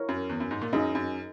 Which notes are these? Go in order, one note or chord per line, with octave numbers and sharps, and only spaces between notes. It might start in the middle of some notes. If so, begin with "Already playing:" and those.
Already playing: E4 A#4 C#5
F#2
E2
F#2
G#2
A#2
F#2 D#4 G#4 D#5
F#2